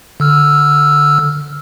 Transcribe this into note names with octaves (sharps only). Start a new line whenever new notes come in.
D3 E6 F6